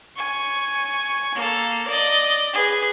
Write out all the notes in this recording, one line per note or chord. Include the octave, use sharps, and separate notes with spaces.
G#5 C#6
A#3 A4
D5 D#5
G#4 B4